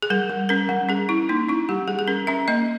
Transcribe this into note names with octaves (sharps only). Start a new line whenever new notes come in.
G#4
G3 A#4
G3
C#4 A#4
G3
C#4 G#4
C#4 E4
A#3 D#4
C#4 E4
G3 G4
G3 G#4
G#4
C#4 A#4
C#4 E5
A#3 D#5